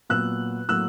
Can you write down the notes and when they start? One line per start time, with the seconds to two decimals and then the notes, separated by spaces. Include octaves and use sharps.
0.10 A#2 F#3 B3 E6 F#6
0.69 A2 F#3 A#3 E6 F#6